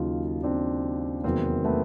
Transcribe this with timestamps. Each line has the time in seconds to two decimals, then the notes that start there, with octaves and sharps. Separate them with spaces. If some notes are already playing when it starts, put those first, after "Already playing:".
Already playing: D#2 C#3 F#3 D#4 F4
0.43 C4 D4
1.24 E2 C3 D#3 F#3 A#3 C4
1.64 A3 B3